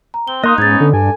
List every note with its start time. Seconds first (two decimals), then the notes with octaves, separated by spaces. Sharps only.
0.14 A#5
0.27 C4 G7
0.44 A#3 D#4 D#5 C6 D#6 F#6
0.58 G#2 B3 C#4 G#6 A6
0.80 D3 A4
0.93 G2 D4 G#5